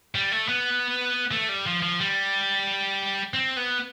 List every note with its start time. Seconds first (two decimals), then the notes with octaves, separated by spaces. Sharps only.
0.15 G3
0.32 A3
0.49 B3
1.32 A3
1.49 G3
1.66 F3
1.82 F3
2.00 G3
3.34 C4
3.56 B3